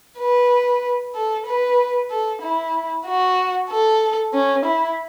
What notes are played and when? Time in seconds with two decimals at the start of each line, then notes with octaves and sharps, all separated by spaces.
0.19 B4
1.15 A4
1.47 B4
2.11 A4
2.42 E4
3.06 F#4
3.70 A4
4.34 C#4
4.65 E4